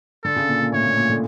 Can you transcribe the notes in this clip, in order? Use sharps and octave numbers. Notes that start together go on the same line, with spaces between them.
D3 A4
C#3
A#2
A#2
A2 C#5
A#2
A#2
D3